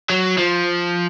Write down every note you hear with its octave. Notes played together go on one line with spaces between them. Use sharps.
F#3
F3